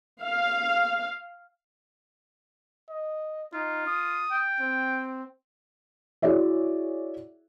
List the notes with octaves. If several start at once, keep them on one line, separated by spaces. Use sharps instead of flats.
F5
D#5
D#4 F4
D#6
G5
C4
E4 F#4 G#4 C#5 D5 E5